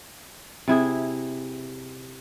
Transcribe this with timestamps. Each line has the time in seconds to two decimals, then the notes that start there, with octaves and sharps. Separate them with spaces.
0.68 C3 E4 G#4